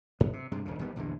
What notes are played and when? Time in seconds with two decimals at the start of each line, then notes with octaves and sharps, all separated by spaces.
0.20 E1 G2 B3
0.33 C3
0.52 G2 C3 G#3
0.65 D#1 D2 C#3
0.79 G#1 D#3 G3 B3
0.96 A#1 E2 G2 D3